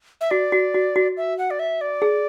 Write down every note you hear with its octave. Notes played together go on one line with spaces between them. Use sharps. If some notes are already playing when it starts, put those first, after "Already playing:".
E5
F#4 D5
F#4
F#4
F#4
E5
F#5
D5
E5
D5
G#4